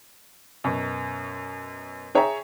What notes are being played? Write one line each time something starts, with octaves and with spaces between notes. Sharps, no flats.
F#2 B2
G#4 C#5 E5 G5 A#5